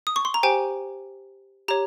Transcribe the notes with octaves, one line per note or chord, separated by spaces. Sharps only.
D#6
C#6
C6
A#5
G4 C5 G5 G#5
G4 C#5 A#5